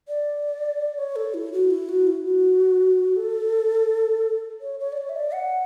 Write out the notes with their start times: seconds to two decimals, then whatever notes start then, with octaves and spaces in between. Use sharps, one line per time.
0.08 D5
0.98 C#5
1.16 A4
1.34 E4
1.53 F#4
1.71 E4
1.89 F#4
2.07 E4
2.25 F#4
3.16 A4
4.61 C#5
4.80 C#5
4.93 D5
4.97 C#5
5.09 E5
5.16 D5
5.34 F#5